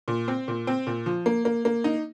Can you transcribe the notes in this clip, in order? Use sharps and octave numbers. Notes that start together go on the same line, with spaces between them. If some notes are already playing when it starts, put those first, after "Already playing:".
A#2
C4
A#2
C4
A#2
F3
A#3
A#3
A#3
D#4